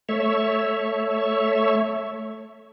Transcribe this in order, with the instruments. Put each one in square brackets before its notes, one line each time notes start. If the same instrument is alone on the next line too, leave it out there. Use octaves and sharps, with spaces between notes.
[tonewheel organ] A3 C#5 E5